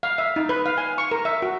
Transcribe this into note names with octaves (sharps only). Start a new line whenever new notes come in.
F5
E5
D#4
B4
F5
G#5
C#6
A#4
E5
F#4